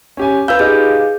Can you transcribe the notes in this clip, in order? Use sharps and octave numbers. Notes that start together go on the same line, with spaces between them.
C#4 G4 G#5
F4 B4 F5 E6 G6
D#4 F4 G4 G#4